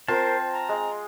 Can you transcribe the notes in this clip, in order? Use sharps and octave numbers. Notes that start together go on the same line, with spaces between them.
C4 F4 A#4 C5 A5
A#5
G#3